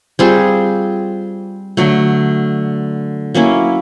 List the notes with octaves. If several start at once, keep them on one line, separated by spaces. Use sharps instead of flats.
G3 C4 F4 G#4
D3 F#3 A3
F#3 A#3 C#4 E4